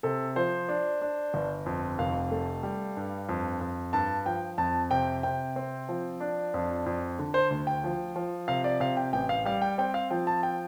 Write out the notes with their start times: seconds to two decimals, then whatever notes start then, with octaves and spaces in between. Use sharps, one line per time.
0.03 C3 A4
0.36 F3 C5
0.69 D4
1.02 D4
1.34 G1
1.66 F2
1.99 F1 F5
2.31 A3
2.63 G3
2.97 G2
3.29 F2
3.61 F2
3.93 G2 A5
4.26 F3 G5
4.58 F2 A5
4.91 C3 G5
5.23 C3 G5
5.56 C4
5.89 F3
6.20 D4
6.54 F2
6.86 F2
7.19 D3
7.34 C5
7.51 D2
7.67 G5
7.84 F3
8.16 F3
8.48 C3 F5
8.64 D5
8.80 C3 F5
8.97 G5
9.13 A1 G5
9.29 F5
9.45 G3 F5
9.62 G5
9.78 C4 G5
9.94 F5
10.11 F3 G5
10.27 A5
10.43 G5